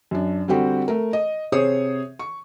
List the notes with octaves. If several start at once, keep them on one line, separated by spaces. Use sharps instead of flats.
F#2 D4
D3 G3 C4 F#4 G4
A3 A#4
D#5
C3 G#4 C5 C#5 D#6
C#6